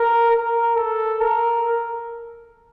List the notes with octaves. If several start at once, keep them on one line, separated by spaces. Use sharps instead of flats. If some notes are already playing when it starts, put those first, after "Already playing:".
Already playing: A#4
A#4
A4
A#4